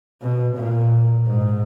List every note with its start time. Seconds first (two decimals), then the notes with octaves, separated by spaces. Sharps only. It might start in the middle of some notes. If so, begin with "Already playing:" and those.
0.22 B2
0.56 A#2
1.27 G#2